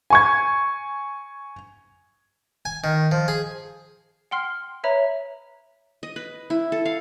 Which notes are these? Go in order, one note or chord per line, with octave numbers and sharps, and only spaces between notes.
G#5 C#6 G#6
G#5
D#3
F3
G#4
F#5 G5 C6 F6 C7
B4 C#5 E5 A#5 B5
D#5
B4
E4
A4
F5